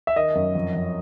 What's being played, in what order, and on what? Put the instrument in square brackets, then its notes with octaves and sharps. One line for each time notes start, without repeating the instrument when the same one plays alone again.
[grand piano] E5
D#3 D#5
F#2
F2
F2